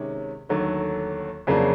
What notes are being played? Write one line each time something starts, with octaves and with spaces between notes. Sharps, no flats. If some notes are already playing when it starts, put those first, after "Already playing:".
Already playing: C3 D#3 G#3 C#4
D#2 D3 F#3 A3
F2 C#3 F#3 A#3 D4